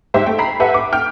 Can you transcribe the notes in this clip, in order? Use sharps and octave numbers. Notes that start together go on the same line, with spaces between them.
G#2 G4 C5 E5 B6
A3 G5
A#5 B5 B6 C7
G4 A4 B4 E5 F#5
D6
G5 F6